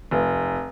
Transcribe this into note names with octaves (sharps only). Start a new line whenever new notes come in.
F1